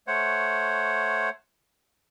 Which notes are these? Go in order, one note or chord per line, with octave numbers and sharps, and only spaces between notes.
A3 C5 C#5 F#5